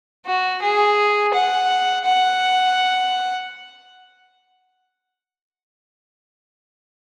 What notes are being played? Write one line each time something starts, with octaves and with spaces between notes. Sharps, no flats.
F#4
G#4
F#5
F#5